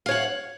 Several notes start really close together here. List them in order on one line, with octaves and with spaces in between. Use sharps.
F5 C#5 F#5